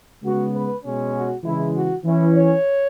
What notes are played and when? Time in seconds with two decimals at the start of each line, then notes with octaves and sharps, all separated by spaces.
0.23 C#3 G#3 B3 F#4
0.54 B4
0.83 B2 G#3 C#4
1.14 F#4
1.44 C#3 E3 G#3 E4
1.74 F#4
2.05 E3 C#4 E4
2.35 C#5